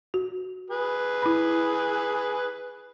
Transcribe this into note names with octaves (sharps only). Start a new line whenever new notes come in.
F#4
G#4 B4
E4 B5